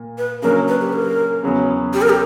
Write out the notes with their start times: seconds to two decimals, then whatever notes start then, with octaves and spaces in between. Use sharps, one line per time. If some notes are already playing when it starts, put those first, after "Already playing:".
Already playing: A#2
0.18 B4
0.42 C#3 F#3 A#3 D4 A#4
0.68 B4
0.81 G4
0.93 A#4
1.43 E2 C#3 F#3 B3
1.93 G4
2.02 A#4
2.09 G4